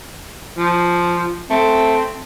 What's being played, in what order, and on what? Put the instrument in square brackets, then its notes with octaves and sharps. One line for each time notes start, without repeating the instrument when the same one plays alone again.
[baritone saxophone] F3
[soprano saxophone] A3 [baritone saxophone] C4